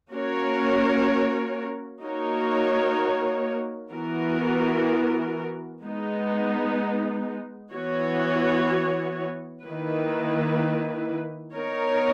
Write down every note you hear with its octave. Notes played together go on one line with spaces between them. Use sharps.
A#3 C#4 F#4 A#4 C#5
A#3 D#4 F#4 A#4 C#5
E3 B3 F#4 A#4
G#3 B3 D#4
E3 B3 F#4 C#5
D#3 A#3 E4 B4
B3 D#4 A#4 C#5